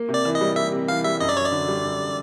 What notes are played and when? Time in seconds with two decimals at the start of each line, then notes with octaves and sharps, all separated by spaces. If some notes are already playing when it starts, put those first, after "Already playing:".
Already playing: A#3
0.09 C3
0.14 D5
0.25 E3
0.35 D#5
0.41 G3
0.56 A#3 E5
0.72 C3
0.88 E3 F5
1.04 G3 E5
1.20 F#2 D#5
1.29 D5
1.37 F#2 C#5
1.45 D5
1.52 D3
1.68 G3
1.84 F#2